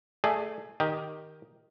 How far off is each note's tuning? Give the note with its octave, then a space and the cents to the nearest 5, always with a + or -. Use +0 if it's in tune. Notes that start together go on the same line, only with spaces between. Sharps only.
A3 +5 G#4 +5 D5 +40
D#3 +0 G4 -5 D#5 +0